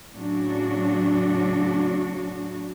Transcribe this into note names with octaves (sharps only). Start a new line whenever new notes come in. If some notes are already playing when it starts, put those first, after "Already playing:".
A2 C#3 F#3 D4 F#4